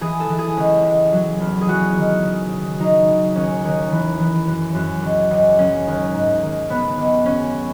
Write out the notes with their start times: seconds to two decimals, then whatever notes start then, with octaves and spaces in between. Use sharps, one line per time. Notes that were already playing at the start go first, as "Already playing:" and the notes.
0.01 E3 G#4
0.20 A4
0.29 E3
0.38 G#4
0.57 C#2
0.85 C#2
1.12 F#3
1.40 E2
1.61 G#4
1.68 F#3 F#4
1.96 D#3
2.24 C#3
2.52 C#3
2.80 F#3 D#4
3.08 C#3
3.35 D#2 C#4
3.64 D#2
3.92 E3
4.19 E3
4.47 F#2
4.75 F#2
5.03 C#2
5.31 C#2
5.58 F#3 C#4
5.87 D#2
6.14 G#2
6.42 D#3
6.69 C#3 B3
6.98 C#2
7.26 F#2 C#4